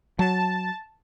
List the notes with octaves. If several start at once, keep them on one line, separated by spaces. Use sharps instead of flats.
F#3 A5